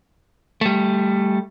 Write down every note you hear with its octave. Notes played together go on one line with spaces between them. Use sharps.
G3 A3